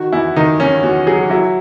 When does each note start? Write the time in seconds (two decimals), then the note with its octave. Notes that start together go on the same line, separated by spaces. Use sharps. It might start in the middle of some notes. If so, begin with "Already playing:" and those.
Already playing: D#3 F#4
0.12 E2 E4
0.36 D#3 D#4
0.60 D#3 C#4
0.83 E2 F#4
1.07 F#3 G#4
1.30 F#3 E4